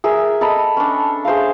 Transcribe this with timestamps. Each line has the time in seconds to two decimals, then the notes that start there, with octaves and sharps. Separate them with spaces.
0.04 G#4 A#4 E5
0.41 A4 D#5 A#5 B5
0.77 C#4 D4
1.25 G#4 C5 E5 F5